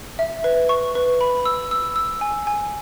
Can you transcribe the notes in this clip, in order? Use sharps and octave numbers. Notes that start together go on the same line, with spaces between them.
E5
B4
C#6
B4
B5
E6
E6
E6
G#5
G#5